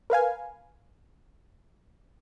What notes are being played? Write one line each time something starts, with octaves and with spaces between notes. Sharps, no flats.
A#4 B4 F5 G#5